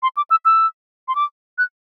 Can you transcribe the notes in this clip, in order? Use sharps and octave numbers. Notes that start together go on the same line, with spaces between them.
C6
D6
E6
E6
C6
D6
F#6